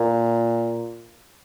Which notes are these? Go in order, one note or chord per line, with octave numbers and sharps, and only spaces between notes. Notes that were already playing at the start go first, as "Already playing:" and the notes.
Already playing: A#2